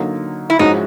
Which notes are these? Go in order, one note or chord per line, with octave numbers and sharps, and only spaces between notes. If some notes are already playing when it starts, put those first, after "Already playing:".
Already playing: D3 F#3 A#3 D#4
E4
G#2 F3 G#3 C#4 D#4 F#4